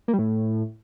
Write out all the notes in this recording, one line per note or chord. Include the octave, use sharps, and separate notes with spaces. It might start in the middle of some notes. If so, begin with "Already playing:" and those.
A#3
G3
A2